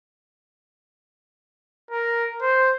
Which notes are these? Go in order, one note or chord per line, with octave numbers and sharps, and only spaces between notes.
A#4
C5